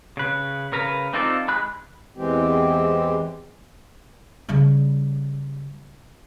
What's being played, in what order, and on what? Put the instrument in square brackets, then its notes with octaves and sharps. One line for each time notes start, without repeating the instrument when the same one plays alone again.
[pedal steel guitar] C#3 B4
C#3 A#4 B4 A#5
C4 D#4 F4 A4 D5
G#3 B5 F#6
[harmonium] E2 E3 G#3 C4 G4
[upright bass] C#3 G3